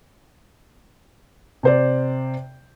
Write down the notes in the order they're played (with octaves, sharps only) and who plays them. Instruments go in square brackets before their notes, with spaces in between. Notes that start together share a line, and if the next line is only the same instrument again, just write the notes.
[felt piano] C3 C5 D5